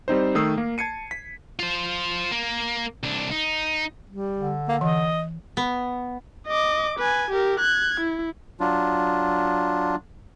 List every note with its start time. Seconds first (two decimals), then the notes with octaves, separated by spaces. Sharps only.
0.08 G3 C4 D#4 C5
0.35 D#3 A3 D#6 E6 C7
0.57 A#3 A#4
0.78 A5 G#6 C7 C#7 D#7
1.11 B6
1.59 F4 C5
2.31 A#3
3.03 C2 D4
3.31 D#4
4.09 G3
4.39 D3
4.69 A#3
4.81 E3 D#5
5.57 B3
6.48 D#5 D6
6.99 B4 G#5
7.31 G4 A#4
7.60 F#6 G#6
8.00 E4
8.60 F#3 D4 F4